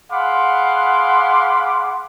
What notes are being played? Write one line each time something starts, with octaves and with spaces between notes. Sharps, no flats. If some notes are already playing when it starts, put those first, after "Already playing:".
G#4 F5 F#5 B5 C6 D6